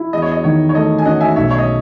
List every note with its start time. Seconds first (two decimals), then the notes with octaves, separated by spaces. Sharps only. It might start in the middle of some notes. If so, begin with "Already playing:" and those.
Already playing: E4
0.13 E2 D#5
0.22 C#5
0.32 D#5
0.44 D#3 C#5
0.69 C#5
0.75 A3 D#5
0.98 G#5
1.05 C#4 D#5 F#5
1.21 E5 G#5
1.36 B1 C#5 E5
1.51 C#5
1.58 D#5